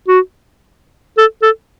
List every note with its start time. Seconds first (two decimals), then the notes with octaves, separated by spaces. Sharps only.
0.08 F#4
1.18 A4
1.42 A4